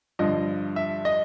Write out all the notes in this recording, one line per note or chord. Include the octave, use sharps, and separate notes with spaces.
G2 D3 F3 D#5
E5
D#5